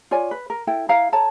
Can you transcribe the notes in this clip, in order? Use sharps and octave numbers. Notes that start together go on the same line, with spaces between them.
F4 C#5 D5 G#5
B4
A#4
E4 A4 G5
E4 F5 A#5
A4 C#5 A5 A#5